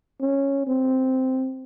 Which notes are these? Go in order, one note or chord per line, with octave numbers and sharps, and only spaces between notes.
C#4
C4